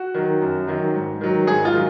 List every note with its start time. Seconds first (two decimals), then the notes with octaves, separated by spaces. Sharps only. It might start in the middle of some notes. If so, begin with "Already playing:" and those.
Already playing: F#4
0.14 D#3 F#3
0.41 F#2
0.67 D#3 F#3
0.94 G#2
1.21 D#3 F#3
1.47 G#2 G#4
1.65 F4
1.74 D#3 F#3